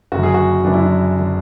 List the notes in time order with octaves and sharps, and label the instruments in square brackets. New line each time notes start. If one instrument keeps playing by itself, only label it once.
[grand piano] F#1 F#2 D3 F#4
G#4
F#4
F#1 F#2 D3 D4
E4
D4
D3